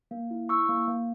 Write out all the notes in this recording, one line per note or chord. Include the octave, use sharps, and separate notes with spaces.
A#3
E4
E4 C#6 E6
A#3
A#3